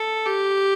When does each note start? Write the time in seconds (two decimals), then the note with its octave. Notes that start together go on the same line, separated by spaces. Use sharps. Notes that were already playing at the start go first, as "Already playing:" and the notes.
Already playing: A4
0.26 G4